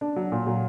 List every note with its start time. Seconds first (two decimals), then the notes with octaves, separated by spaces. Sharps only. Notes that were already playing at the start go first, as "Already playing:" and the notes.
0.01 D4
0.16 F#3
0.32 A#2
0.47 F#3